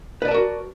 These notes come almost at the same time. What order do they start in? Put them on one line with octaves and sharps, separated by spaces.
B4 D5 A5 A#4 F#4